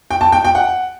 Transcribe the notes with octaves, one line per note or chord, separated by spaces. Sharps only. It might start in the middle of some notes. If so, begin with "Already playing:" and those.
G5
A5
G5
G5
F#5